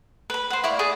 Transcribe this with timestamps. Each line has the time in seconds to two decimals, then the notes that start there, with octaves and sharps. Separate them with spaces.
0.30 B4 B5
0.50 C5 F#5
0.63 E4 D5 F5 C#6
0.79 G#4 D5